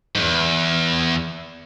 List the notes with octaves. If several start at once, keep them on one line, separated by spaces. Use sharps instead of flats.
E2 G#2